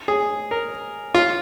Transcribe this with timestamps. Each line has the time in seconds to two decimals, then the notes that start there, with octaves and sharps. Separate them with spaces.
0.08 G#4
0.51 A#4
1.15 F4